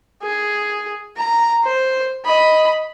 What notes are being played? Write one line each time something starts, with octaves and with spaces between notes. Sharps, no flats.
G#4
A#5
C5
D#5 B5